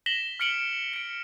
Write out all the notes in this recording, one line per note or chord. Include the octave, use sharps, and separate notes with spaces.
A#6 B6 E7 F#7 G7
F6 B6 C#7 D7 F#7 G7
C#7 D7